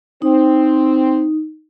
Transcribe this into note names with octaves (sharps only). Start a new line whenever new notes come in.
C4 D#4